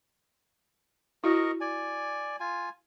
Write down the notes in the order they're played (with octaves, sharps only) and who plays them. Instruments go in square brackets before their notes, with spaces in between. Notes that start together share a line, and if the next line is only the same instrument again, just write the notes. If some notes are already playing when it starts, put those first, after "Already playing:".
[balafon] E4 F#4 [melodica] A#4 D#5 C#6
[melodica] D5 G#5
F4 G#5